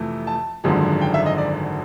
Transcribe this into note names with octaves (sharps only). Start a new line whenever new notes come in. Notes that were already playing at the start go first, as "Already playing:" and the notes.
Already playing: F2 C3 E3 A3
A5
G#1 F#2 D3 F3 G#3
G5
E5
D#5
D5